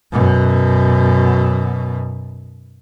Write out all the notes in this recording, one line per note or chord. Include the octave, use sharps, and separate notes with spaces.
F#2 B2